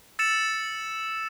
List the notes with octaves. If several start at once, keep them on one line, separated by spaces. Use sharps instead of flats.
E6 A6 C#7 E7